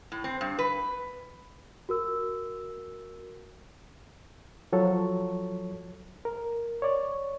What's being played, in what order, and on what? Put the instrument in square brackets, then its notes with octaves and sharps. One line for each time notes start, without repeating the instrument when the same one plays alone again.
[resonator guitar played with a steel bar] A2
C4
G2
B4
[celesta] F#4 A#4 E6
[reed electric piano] F3 F#3 A4 C#5
A#4
C#5 D5